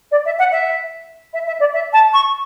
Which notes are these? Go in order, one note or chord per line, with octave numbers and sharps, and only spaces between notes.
D5
E5
F#5
E5
E5
E5
D5
E5
A5
C#6